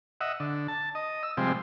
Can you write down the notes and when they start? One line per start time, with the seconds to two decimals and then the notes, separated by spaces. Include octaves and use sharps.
0.21 D#5 E5 F#5
0.40 D3
0.68 A5
0.95 D#5
1.23 E6
1.37 C3 F3 G3 G#3 C4